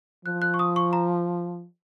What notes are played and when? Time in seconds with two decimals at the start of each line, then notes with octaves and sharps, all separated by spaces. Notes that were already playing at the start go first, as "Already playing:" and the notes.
0.25 F3 F#6
0.42 F#6
0.54 C#6
0.59 D#6
0.76 C#6
0.93 A#5